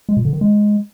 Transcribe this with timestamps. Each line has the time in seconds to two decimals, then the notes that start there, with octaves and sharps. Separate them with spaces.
0.09 G#3
0.17 A#2
0.25 D3
0.33 D#3
0.41 G#3